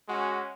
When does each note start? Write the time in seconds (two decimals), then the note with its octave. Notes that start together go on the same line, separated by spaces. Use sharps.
0.08 G#3 C#4 F#4